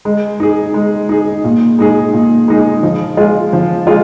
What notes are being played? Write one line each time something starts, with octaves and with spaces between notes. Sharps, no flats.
G#3
D#4 G#4
G#3
D#4 G#4
A#2
G#3 D#4 G#4
A#2
G#3 D#4 G#4
F3
G#3 F4 G#4
F3
G#3 F4 G#4